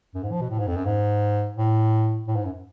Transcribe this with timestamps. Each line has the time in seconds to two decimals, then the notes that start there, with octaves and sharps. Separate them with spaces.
0.14 F#2
0.23 G#2
0.32 F3
0.41 B2
0.50 A2
0.59 G#2
0.67 F2
0.76 F#2
0.85 G#2
1.57 A2
2.28 A2
2.36 G#2
2.45 F#2